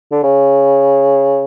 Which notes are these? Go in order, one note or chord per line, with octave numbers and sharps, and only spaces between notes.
D3
C#3